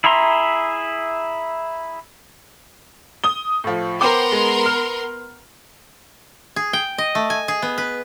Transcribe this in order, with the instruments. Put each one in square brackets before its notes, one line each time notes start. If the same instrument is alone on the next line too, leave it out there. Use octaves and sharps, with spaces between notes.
[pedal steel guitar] E4 G#4 E5 A#5 C6
[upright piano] D#6 G7
A2 F3
[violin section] B3 A#4 C6 [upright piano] C5 G5 D6
[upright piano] G#3
F6
[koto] G#4
G5
D#5
A3
G#5
G#4
B3
B4